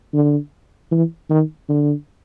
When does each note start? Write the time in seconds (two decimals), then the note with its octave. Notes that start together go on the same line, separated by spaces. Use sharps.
0.13 D3
0.91 E3
1.30 D#3
1.69 D3